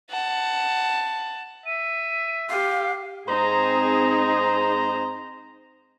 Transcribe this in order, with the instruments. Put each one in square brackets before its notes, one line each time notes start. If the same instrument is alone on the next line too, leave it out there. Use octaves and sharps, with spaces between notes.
[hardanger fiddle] F#5 A5
[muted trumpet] E5 [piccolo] D#7
[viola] G4 [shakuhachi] F5 [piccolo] C7
[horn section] G#2 C5 A#5 [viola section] C4 D#4 G#4